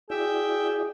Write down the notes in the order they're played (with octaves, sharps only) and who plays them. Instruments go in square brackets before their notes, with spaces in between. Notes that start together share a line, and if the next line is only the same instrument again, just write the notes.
[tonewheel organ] E4 F#4 D5 [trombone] G#4 [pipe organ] E5 G5